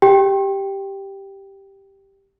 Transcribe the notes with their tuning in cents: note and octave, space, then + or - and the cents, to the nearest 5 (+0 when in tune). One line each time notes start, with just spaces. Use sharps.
G4 +0 G5 +0